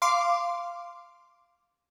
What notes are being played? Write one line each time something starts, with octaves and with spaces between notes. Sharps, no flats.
F5 C6 D6